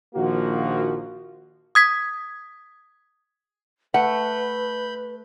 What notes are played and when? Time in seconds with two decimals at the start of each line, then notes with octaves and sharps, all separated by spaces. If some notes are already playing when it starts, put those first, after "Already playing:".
0.15 A#1 D#3 F3 A#3 F#4
1.75 D#6 G#6 B6
3.94 A3 B4 F#5 B5 G6